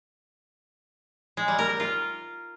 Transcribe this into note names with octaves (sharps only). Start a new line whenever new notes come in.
G#3
G3
A#4
A#4
F4